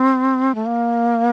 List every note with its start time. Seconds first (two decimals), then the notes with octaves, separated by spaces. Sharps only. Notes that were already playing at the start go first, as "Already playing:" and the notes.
Already playing: C4
0.55 A3
0.66 A#3